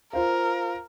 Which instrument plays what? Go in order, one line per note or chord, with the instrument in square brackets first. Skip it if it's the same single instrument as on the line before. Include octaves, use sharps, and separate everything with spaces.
[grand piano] F4 C5 F5 [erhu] A#4